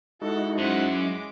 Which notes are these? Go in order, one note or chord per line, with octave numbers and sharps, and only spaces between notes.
G#3 D#4 E4 F#4 A4 F#5
F#2 C5 F#5
G#3 D6